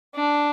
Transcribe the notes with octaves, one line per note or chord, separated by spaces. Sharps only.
D4